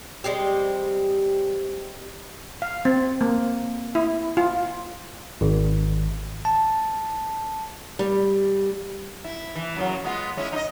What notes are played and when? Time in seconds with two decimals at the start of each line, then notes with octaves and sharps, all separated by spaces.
0.24 G3 G#3 C4 G4
2.62 F5
2.85 C4
3.21 A#3
3.95 E4
4.37 F4
5.41 G#1
6.45 A5
7.99 G3
9.24 E4
9.55 E3
9.76 F#2 C#3 F#3
10.04 G#3 B3 F4
10.37 G#3 C#4 E4
10.52 D#4 D#5